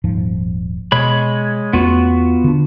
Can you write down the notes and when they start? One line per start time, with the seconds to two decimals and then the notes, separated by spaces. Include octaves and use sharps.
0.04 D#1 G#2 F3
0.92 B2 G#3 C#5 B5
1.73 E2 A3 B3 C#4 F4 F#4
2.44 D3 D4